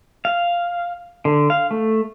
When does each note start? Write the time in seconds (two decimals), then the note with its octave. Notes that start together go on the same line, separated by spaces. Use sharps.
0.25 F5
1.25 D3
1.50 F5
1.71 A3